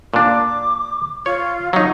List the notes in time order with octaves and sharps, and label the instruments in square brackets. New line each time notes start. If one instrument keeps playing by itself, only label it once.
[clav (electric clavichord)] A#2 D4 [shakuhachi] D6
[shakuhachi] F4 [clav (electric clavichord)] C#5
[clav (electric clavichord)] F#3 D#4 [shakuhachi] C#6